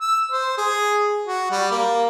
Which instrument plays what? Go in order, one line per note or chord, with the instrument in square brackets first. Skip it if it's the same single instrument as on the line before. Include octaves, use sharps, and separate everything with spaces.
[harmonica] E6
C5
G#4
F#4
G3
A#3